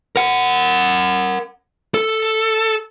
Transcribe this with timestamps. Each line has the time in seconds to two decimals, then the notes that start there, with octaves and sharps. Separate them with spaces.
0.16 A#4 F#5
1.94 A4